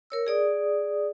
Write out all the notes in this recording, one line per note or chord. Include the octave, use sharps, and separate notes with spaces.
A#4 C#5 E6
G#4 D5 D#6